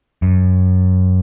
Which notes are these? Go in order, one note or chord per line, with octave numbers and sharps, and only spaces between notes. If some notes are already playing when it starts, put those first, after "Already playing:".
F#2